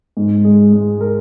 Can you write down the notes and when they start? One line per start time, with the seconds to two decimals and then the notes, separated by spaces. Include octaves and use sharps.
0.17 G#2
0.45 G#3
0.73 G#3
1.01 A#4